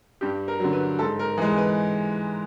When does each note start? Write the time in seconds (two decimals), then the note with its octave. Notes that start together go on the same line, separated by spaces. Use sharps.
0.21 G2 G4
0.48 A#4
0.60 D3 F#3
0.73 B4
0.99 G#2 A4
1.19 A#4
1.38 E3 G#3
1.58 B4